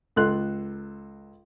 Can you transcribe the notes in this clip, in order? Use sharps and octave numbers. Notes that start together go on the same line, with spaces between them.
C#2 A4 C6 F#6